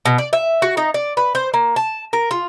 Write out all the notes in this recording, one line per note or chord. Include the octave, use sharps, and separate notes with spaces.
B2
D5
E5
F#4
D#4
D5
B4
C5
A#3
A5
A#4
F4